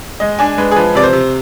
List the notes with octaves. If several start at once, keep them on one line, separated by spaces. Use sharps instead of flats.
G#3 D#5
D4 G#5
G#3 B4
G#4
F3 B4
C3 D5
C5
C3